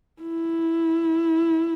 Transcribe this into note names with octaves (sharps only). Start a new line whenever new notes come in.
E4